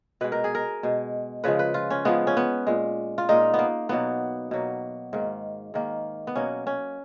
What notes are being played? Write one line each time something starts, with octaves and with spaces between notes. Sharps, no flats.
B2 G#3 B4
A#4
G#4
A#4
B2 G#3
C#3 F3 G#3 B4
B4
F4
C#4
C#3 F3 G#3 B3
C#4
B3
A#2 G#3
F4
A#2 G#3 D#4
B3
A#3
B2 F#3 A#3 B3
B2 F#3 A#3
G#2 D#3 A#3
G#2 D#3 A#3
B3
B2 F#3 A#3 C#4
C#4